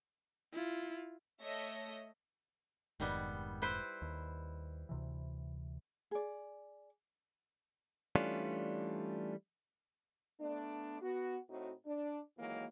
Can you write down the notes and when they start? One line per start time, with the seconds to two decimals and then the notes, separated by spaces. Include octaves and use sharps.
0.53 E4 F4
1.43 A3 C#5 D#5 E5 A#6
3.00 F1 G#2 D#3 G3 B3
3.62 E4 B4 C5
4.02 D#2
4.89 D2 C3 E3
6.11 G#4 D5
8.16 E3 G3 A3 C#4 D4 F4
10.40 A3 B3 D4
11.02 B3 F#4
11.50 A2 C4 D#4 F#4
11.86 D4
12.38 D#2 E3 F#3 G#3 A#3